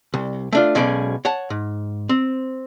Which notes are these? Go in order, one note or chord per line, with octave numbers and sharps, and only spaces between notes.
C2
A3 D4 F4
B1 B2 G#3 C#4 D5
C#5 F#5 A5
G#2
C4